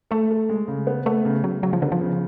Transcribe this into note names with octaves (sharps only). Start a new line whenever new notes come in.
A3 A4
A4
G#3
C#3
B3
A3 B3
C#3
C#3 F#3
C#3 F#3
F3
D3 B3
F3
C#3